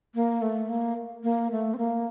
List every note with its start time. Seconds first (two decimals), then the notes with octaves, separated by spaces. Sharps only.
0.15 A#3
0.42 A3
0.69 A#3
1.23 A#3
1.52 A3
1.74 C4
1.78 A#3